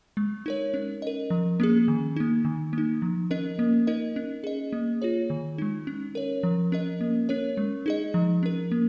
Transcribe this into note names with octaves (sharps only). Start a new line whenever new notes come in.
G#3
D#4 A#4 C#5
C#4
A#4 D#5
F3
A#3 C#4 G#4
D#3
A#3 D#4
D#3
A#3 D#4
F3
C#4 A#4 D#5
A#3
D#4 A#4 D#5
C#4
G#4 D#5
A#3
F4 G#4 C#5
D#3
G#3 D#4
C#4
A#4 C#5
F3
C#4 A#4 D#5
A#3
C#4 A#4 C#5
G#3
D#4 G#4 D#5
F3
C#4 A#4
A#3